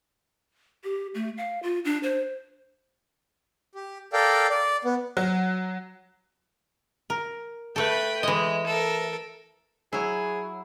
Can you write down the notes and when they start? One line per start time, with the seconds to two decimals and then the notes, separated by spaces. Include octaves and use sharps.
0.84 G4
1.15 A3
1.38 F5
1.63 F4
1.85 D4
2.03 C5
3.75 G4
4.13 A4 A#4 D5 F5 G5
4.50 D5
4.85 B3
5.17 F#3
7.10 A#4
7.76 A3 A4 B4 G5
8.23 E3 G#3 D#5
8.66 A4 A#4
9.93 F#3 E4 G#4